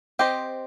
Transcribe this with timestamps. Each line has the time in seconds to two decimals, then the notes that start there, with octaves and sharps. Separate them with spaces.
0.19 C4 G4 C5 D#5